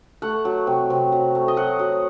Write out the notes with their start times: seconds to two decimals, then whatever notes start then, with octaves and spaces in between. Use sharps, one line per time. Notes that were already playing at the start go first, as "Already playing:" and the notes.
0.22 A3 F#5
0.45 F#3
0.67 C3
0.90 C3
1.12 F#3
1.35 A3
1.48 D#5
1.57 F#3 F#5
1.79 F#3